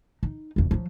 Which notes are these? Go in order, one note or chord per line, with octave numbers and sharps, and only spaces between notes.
D#4
E1 F2
F3 F#3